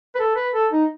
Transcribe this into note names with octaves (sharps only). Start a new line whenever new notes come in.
B4
A4
B4
A4
D#4